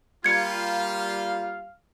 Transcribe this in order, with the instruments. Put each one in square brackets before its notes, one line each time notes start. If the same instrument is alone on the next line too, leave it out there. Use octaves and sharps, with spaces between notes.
[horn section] G3 A#3 F4 [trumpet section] F5 [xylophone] G#6 C#7